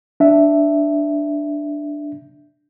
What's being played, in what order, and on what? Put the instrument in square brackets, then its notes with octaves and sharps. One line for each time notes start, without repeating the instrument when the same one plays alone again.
[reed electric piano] D4 E5